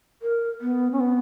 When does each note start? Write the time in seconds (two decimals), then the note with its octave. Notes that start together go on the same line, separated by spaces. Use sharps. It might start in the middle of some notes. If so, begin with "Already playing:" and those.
0.22 A#4
0.61 B3
0.92 C#4
1.00 B3